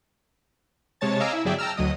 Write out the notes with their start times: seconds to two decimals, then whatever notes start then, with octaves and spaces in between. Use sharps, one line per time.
1.01 C3 G#3 C#5 A5 A6
1.20 D#5 F5 G#5 A#5 D6 E6
1.33 E4 E5
1.45 G1 F#3 G#4 D5 E5 G5
1.58 G5 A5 A#5 E6 F6
1.77 D2 F#3 D#5 D#6